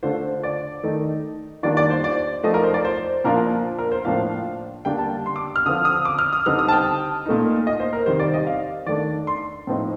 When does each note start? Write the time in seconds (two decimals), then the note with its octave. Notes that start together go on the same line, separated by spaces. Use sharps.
0.03 D3 A3 D4 F4 C5
0.43 D5
0.83 D#3 A3 D#4
1.63 D#3 G3 A#3 D4 F4 D5
1.77 D5
1.90 C5
2.04 D5
2.43 F3 A3 D#4 D#5
2.54 A#4
2.64 C5
2.74 D5
2.85 C5
3.24 A#2 F3 A#3 D4 F4 A#4
3.78 A#4
3.92 C5
4.05 A2 F3 A#3 D4 F4 F5
4.85 D3 G3 A#3 D4 G5
4.99 A5
5.26 C6
5.36 D6
5.56 F6
5.66 D3 F3 C4 F4 D#6
5.85 D#6
6.05 D6
6.19 F6
6.33 D#6
6.46 D3 G3 C4 D#4 F6
6.59 D#6
6.68 A5
6.72 G5
7.26 A#2 A3 D#4
7.67 D#5
7.80 C5
7.93 A#4
8.06 C3 D#3 G3 C5
8.19 D5
8.34 D#5
8.46 F5
8.86 D#3 A3 D4 D5
9.27 C6
9.67 A2 F3 C4 D#4